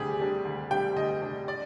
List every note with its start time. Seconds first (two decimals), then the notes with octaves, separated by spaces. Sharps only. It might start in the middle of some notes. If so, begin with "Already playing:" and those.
Already playing: D2 C3 G3 D4 G4 G#4
0.19 C3 G3 D4
0.45 D2
0.70 C3 G3 D4 G5
0.96 D2 D#5
1.22 C3 G3 D4
1.48 D5